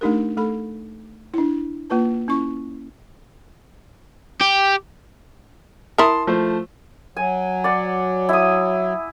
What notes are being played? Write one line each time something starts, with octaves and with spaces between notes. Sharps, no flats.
A3 D4 D#4 G4 A#4
A3 A4 B5
D4 E4
A#3 F4 B4 A5
C#4 E4 C#6
G4
E4 A#4 A5 C6 D#6
F3 A3 C5
F#3 G#5
D5 F#5
E4 D#6